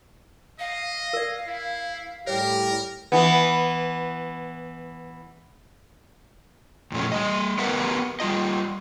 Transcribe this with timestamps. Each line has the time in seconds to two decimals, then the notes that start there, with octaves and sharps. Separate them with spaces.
0.59 D#5 F5
1.13 A#4 D5
1.47 E4
2.27 A2 G3 G4 A#4 C#5
3.12 E3 B3
6.92 F2 A#2 A3 C#4
7.12 G3 D#5
7.58 B3 G4 A#4 B4 E5 F#5
8.20 G3 B3 F4 D#5